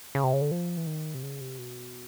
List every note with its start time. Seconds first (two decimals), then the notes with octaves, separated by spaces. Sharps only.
0.15 C#3
0.24 C3
0.33 C#3
0.41 D3
0.51 F3
0.77 E3
0.87 D#3
1.14 C3
1.23 C#3
1.41 C3
1.58 B2